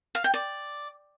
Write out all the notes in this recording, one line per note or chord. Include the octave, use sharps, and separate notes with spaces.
F5
G5
D5